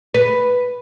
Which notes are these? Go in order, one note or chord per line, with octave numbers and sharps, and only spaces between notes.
B4